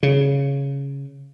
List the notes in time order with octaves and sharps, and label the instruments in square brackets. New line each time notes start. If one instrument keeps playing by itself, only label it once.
[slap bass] C#3